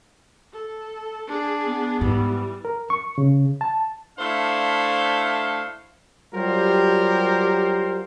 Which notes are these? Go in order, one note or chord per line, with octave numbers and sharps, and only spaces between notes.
A4
D4 G#4
B3
G#2 E3 G3
A#4
C#6
C#3
A5
A3 D4 E4 C5 F5
F#3 G3 F4 G4 A#4 C5